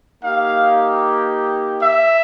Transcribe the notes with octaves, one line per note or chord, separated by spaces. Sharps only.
A#3 D#4 G4 F5
E5